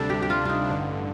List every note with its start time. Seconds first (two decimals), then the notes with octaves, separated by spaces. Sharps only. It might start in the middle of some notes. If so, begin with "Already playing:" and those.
Already playing: D2 C3 G3 D4 A4
0.10 G4
0.22 G4
0.30 F4
0.45 D#4 F4
0.70 A1 G2 D3